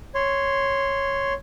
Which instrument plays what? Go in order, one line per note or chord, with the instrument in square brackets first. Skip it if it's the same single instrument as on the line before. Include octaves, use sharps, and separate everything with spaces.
[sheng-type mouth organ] C#5 C6